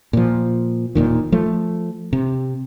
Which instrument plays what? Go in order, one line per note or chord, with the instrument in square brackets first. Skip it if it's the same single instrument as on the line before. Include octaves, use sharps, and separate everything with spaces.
[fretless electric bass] A#2 F3
E1 A#1 A#2 D#3
F3 A3
C3